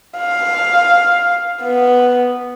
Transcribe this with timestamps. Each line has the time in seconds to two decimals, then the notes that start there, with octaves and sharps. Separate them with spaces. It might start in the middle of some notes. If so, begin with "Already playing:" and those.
0.18 F5
1.63 B3